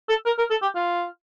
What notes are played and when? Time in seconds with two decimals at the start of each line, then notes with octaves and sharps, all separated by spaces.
0.09 A4
0.26 A#4
0.38 A#4
0.51 A4
0.62 G4
0.75 F4